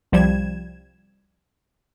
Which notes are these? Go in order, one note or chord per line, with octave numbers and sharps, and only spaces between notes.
C2 F3 G3 G#6 E7